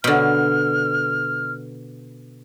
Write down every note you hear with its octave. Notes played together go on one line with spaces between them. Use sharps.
B2 D3 F6